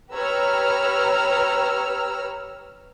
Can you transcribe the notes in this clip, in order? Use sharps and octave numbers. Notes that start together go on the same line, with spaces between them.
G4 B4 C#5 A#5 E6 F6